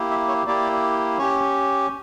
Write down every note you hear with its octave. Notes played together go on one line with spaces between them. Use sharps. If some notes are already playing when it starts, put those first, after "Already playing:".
Already playing: A#3 E4 G4
E5
C#5
A#3 E4 G4 D5
C#4 G4 C#5